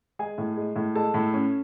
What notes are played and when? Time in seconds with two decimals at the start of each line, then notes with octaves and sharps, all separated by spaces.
0.19 G#3 G#4 G#5
0.38 A2
0.57 G#3
0.76 A2
0.95 G#3 A4 A5
1.14 A2
1.34 C#4